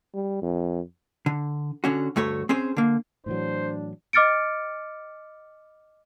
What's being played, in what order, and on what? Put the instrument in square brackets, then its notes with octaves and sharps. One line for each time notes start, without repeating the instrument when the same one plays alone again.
[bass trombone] G3
F2
[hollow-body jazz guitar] D3
D3 C#4 F#4
D2 G2 A3 F#4 C#5
C4 C#4 G#4 C5
D3 A#3
[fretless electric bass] A2 E3 F#3 [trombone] D4 [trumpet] C5
[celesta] D#5 D6 F6 A6 C#7 D7